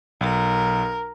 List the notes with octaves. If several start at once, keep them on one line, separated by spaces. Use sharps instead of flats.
B1 A#4